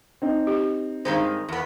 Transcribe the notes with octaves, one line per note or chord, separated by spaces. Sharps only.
C4 D#4
G4
G2 D#3 G#3 C5
E2 B3